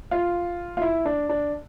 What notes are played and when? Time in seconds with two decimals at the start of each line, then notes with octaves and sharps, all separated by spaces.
0.11 F4
0.77 F4
0.82 E4
1.05 D4
1.29 D4